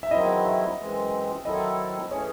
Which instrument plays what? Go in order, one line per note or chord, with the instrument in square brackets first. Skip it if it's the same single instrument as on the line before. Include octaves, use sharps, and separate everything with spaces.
[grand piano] E5
[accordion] E2 D#3 F#3 C4 E4 [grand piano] D#5
[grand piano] E5
[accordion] F#2 E3 G#3 C4
[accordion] D#3 F#3 C4 E4 A4 [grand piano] D#5
[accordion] E3 A3 C#4 G#4 [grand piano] C#5